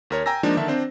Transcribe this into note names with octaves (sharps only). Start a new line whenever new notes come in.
D#2 A#4 C#5
G5 G#5 A#5 E6 A#6
F3 G#3 A#3 D4 D#4
D3 D#3 E5 A5
C4 D4 C5